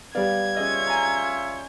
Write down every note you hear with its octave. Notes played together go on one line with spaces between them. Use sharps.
G3 B3 D5 F5 G#6
C#4 F4 G#4 C#5 D#5 E5
G#5 A#5